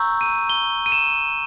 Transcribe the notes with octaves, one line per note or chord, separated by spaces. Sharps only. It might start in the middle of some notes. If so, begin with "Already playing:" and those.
Already playing: A#5 C#6 E6 G6
D#7
G7
D#7
E7